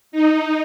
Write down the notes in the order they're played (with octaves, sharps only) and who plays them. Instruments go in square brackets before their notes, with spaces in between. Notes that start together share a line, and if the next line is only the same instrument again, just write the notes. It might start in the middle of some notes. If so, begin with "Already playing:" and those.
[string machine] D#4